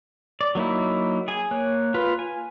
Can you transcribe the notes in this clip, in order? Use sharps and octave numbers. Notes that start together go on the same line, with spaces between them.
D5
F#3 A#3 D#4 E4
G#4 G#5
A#3 C#5 F#6
F4 B4
G#5